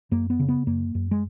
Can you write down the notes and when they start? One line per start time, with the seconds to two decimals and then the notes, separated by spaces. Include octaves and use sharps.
0.11 F#2 A#3
0.30 B3
0.40 C#3
0.49 B3
0.67 F#2 A#3
0.95 F#2
1.11 G#3